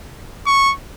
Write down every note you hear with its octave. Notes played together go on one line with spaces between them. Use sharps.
C#6